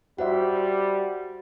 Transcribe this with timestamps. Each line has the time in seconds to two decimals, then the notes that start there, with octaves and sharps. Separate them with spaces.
0.18 G3 F#4 C5 E5 F#5